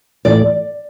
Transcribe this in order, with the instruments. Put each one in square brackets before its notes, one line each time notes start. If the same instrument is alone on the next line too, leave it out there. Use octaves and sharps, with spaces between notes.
[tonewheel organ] A2 E3 A3 [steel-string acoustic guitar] D5